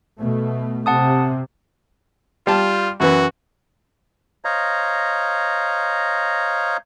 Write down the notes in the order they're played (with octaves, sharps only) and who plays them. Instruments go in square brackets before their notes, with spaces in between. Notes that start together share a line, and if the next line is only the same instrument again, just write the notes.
[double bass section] B2 A3
[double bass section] C3 [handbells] F#5 A5 D#6
[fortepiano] G3 A5 [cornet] F4
[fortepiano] F#2 E3 B4 [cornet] F#4
[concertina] C5 C#5 D#5 F5 A#5